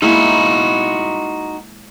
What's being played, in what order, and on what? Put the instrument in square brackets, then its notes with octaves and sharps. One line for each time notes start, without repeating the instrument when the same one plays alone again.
[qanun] G#3 A#3 E4 [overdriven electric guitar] D#4 F#4